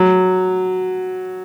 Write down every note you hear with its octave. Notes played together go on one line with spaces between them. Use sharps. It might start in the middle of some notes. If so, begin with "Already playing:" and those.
Already playing: F#3